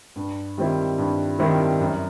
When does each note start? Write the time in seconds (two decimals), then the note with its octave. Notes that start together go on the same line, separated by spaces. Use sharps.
0.16 G2
0.58 D#3 G3 C4 E4
0.98 G2
1.39 D#3 G3 C4 E4
1.81 F#2